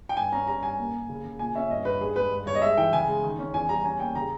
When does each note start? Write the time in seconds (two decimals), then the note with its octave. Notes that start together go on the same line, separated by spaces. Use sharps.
0.09 G5
0.17 G2 G#5
0.32 C#4 A#5
0.47 G3 A#5
0.63 G2 G#5
0.78 A#3
0.93 A#3
1.09 C#3
1.24 C#3
1.39 A#2 G#5
1.55 C#4 E5
1.70 G2 D#5
1.85 G2 B4
2.01 G2 G#4
2.16 G#3 B4
2.31 G2
2.46 G2 C#5
2.55 D#5
2.62 G#3 E5
2.77 E3 G5
2.93 C#3 G#5
3.08 G#3
3.23 D#3
3.39 C#4
3.54 E2 G#5
3.69 G3 A#5
3.84 C#4 G#5
4.00 A#3 G5
4.15 C#3 A#5